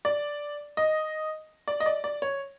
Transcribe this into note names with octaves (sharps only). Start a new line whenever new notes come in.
D5
D#5
D5
D#5
D5
D5
C#5